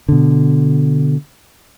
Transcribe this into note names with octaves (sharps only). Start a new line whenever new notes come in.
B2 D3